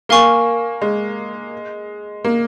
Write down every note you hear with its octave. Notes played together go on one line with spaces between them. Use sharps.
A#3 A#4 F5 G#5 C#6
G#3
A#3